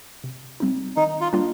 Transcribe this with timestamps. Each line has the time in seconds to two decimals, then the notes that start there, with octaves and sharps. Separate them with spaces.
0.24 C3
0.60 G3 C4 D#4
0.96 D#3 D#4
1.21 F4
1.33 G3 A#3 D4 F4